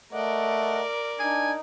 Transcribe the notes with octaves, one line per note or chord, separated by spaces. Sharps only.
A3 A#4 D5 D#5 F#5
D4 D#4 G#5